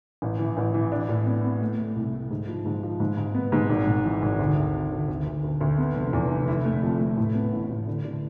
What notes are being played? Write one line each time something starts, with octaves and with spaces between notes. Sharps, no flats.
A1
E3
A1
E3
D4
A2
B3
B3
A3
A3
C2
A3
G#2
F3
G#2
F3
G#2
G#2
B3
G#2
G#1
G#1
E3
G#1
D2
D2
C3
D2
D2
D2
D2
D2
B3
F1
E2
F1
E4
A3
F2
A3
A2
B3
A1
A2
D3
D3